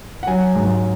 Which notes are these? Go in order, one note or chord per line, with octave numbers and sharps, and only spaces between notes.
F#5
F#3 G#5
G#2